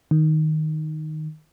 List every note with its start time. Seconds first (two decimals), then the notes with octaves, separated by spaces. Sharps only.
0.11 D#3